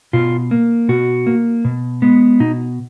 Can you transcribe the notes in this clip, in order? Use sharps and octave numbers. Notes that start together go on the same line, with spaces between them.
B2 F4
A#3
B2 F#4
A#3
B2
G#3 B3
B2 D#4